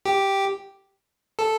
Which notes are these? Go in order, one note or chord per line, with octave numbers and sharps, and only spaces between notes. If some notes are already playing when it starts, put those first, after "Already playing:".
G4
A4